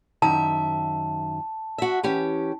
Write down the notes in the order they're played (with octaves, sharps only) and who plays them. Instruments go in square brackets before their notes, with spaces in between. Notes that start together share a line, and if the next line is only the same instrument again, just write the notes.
[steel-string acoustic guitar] F#2 D#3 E5 [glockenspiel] A5
[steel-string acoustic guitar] F#4 E5
E3 C#4 G4